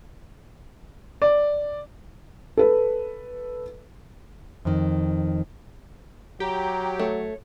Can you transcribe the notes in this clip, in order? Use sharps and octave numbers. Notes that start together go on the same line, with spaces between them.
D5
A4 B4
F2 D#3
F#3 G4 A#5
A3 C#5